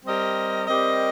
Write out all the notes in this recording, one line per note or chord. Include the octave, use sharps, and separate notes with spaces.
G3 C4 G4 A#4 D#5
G3 C4 G4 A#4 D#5